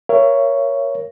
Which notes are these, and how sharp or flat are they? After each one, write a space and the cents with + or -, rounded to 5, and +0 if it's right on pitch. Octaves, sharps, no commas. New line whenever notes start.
A#4 +15 C#5 +5 E5 +40